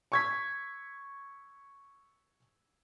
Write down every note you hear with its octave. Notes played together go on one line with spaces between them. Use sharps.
C#6 G#6 B6